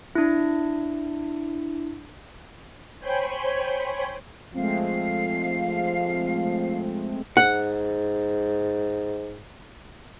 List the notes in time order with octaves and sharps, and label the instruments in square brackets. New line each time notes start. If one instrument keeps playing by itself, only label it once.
[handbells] D4 E4
[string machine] C5 C#5 G5 G#5 B5 C6
[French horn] F3 [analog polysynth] G#3 A3 C4 [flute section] F5
[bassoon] G#2 [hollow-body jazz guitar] F#5